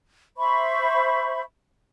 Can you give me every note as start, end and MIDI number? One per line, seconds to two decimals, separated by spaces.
0.37 1.42 72
0.37 1.42 76
0.37 1.42 83
0.37 1.42 85